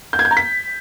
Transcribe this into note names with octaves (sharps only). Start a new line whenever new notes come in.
G6
G#6
G6
A#5
B6